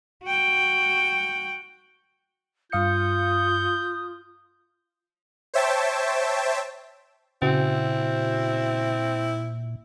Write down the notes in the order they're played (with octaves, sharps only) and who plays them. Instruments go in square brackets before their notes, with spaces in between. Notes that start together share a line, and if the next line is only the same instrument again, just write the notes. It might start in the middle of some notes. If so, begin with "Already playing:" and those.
[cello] F#4 G5
[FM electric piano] G2 F5 C#7 [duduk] F4 [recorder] D#6 [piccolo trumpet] G6
[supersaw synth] C5 C#5 E5 G5 A5
[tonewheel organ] A#2 [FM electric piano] C#3 F#4 [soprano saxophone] C4 [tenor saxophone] E4